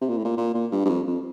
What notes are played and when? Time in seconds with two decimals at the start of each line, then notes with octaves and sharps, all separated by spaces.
0.01 C3
0.09 A#2
0.17 A2
0.24 A#2
0.37 A#2
0.54 A#2
0.72 G2
0.85 G2
0.89 F2
1.07 F2